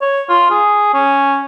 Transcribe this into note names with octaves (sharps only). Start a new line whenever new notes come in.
C#5
F4
G#4
C#4